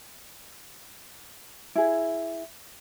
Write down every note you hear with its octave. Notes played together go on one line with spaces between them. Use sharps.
E4 G#4